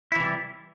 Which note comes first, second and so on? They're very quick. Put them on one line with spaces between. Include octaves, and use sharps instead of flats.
E4 E3 C3 G3